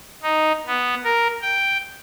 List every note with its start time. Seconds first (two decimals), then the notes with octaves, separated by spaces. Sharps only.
0.23 D#4
0.66 B3
1.04 A#4
1.42 G5